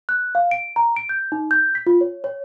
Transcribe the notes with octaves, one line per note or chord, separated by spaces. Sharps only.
F#6
F5
D7
A#5
D7
G6
D#4
G6
B6
F4
C#5
C#5